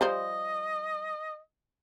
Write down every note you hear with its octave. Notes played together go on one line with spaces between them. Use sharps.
F3 G3 C5 D#5